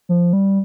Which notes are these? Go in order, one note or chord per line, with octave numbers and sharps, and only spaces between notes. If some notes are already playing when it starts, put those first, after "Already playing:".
F3
G3